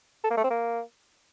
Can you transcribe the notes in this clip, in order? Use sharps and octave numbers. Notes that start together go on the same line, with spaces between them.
A4
A#3
A3
C4
A#3